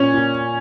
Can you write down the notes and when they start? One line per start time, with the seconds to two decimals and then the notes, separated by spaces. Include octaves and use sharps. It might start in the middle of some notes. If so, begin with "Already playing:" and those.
Already playing: A#2 C#4
0.14 A#2